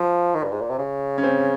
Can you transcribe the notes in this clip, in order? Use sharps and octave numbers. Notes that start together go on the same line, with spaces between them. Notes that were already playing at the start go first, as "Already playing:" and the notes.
Already playing: F3 F4
D#3
G2
G#2
A#2
C3
C#3
C#4
C4